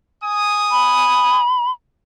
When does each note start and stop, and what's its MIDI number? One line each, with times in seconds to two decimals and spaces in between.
0.23 1.41 80
0.23 1.41 87
0.71 1.71 83